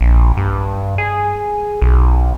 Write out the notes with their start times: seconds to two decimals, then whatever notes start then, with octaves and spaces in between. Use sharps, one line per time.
0.01 A#1
0.37 G2
0.98 G#4
1.82 B1